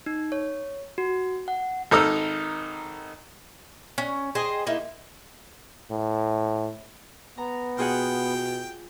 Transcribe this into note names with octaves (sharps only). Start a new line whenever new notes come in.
D#4
C#5
F#4
F#5
G#1 D#4 A4 A#4 D#6 E6
C#4
G#4 C5 D#5 G5
A#3 D#4 E4
A2
B3 A#5
B2 F4 G#4 F#5 G5